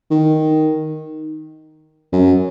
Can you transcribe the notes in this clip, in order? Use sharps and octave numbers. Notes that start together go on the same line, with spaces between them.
D#3
F#2